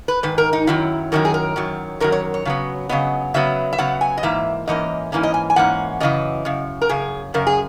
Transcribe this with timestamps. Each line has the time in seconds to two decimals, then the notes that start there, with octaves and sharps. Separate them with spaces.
0.08 B4
0.23 G#2 D#3 B4
0.38 A#4
0.53 D#4
0.67 F#2 D#3 F#3 E4
1.12 F#2 D#3 F#3 A#4
1.25 G#4
1.34 A#4
1.56 F#2 D#3 F#3
2.00 F#2 D#3 F#3 A#4
2.12 C#5
2.34 C#5
2.45 C#3 F#3 B3
2.89 C#3 F#3 B3 D#5
3.34 C#3 F#3 B3 E5
3.73 E5
3.78 C#3 F#3 B3 F#5
4.01 G#5
4.18 D#5
4.23 G#2 E3 A#3 E5
4.68 G#2 E3 A#3 C#4 D#5
5.12 G#2 E3 A#3 C#4
5.23 D#5
5.34 G#5
5.50 G#5
5.56 G#2 E3 A#3 C#4 F#5
6.00 F#2 C#3 E3 D#5
6.45 F#2 C#3
6.81 A#4
6.89 F#2 C#3 G#4
7.34 F#2 C#3 A#4
7.47 G#4